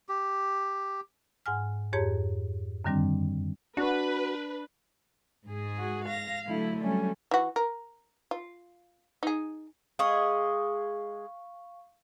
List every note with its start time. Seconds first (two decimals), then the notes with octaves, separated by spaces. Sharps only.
0.09 G4
1.46 G#2 F#5 G#5 F6
1.93 F2 G#2 G4 G#4 C#5 A#5
2.84 F#2 D3 D#3 G3 C4 D4
3.77 D4 F#4 B4
5.47 G#2 G#4
5.76 F#4
6.07 F5 A#6
6.48 D3 F#3 A3 E4
6.83 F#3 G3 A3 C#4
7.31 E3 F#4
7.56 A#4
8.31 F4
9.23 D#4 G#4
9.99 G#3 G#4 F5 C#6